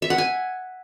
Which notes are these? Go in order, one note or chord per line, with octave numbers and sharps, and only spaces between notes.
E5
F#5
G#5